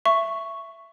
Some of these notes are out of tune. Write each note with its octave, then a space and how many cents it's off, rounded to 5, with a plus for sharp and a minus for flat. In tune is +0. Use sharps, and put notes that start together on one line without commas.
E5 +15 C#6 +0